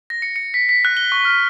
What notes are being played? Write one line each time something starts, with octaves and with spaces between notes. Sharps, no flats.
A#6
C#7
C#7
B6
B6
F#6
G7
C#6
F6